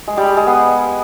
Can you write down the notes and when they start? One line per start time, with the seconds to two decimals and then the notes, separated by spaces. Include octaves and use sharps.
0.08 G#3
0.17 G3
0.27 G#4
0.37 G#3
0.47 B3